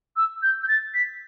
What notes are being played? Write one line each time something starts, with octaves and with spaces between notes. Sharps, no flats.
E6
G6
G6
A6
B6